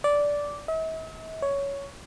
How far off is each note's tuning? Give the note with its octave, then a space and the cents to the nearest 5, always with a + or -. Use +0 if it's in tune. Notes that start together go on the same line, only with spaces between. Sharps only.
D5 -10
E5 -45
C#5 +10